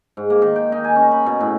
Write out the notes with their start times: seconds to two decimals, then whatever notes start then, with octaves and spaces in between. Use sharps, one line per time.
0.17 G#2
0.30 A#3
0.42 D#3
0.56 G5
0.72 D#4
0.84 G#5
0.96 C#4
1.11 B5
1.26 B2
1.40 A2